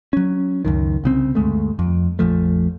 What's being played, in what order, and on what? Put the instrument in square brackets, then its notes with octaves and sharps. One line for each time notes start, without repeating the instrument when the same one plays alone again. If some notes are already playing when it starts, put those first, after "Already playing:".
[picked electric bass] F#3 C#4
C#2 F#2 D#3
C2 C#3 C4
D2 G2 G#3 A3
F2
A#1 F2 F3 A3